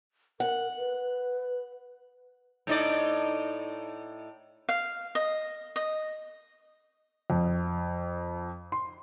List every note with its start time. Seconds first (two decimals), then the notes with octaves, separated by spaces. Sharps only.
0.40 A#4 F#5
0.78 B4
2.67 A2 D#4 D5
4.69 F5
5.15 D#5
5.76 D#5
7.30 F2
8.72 C6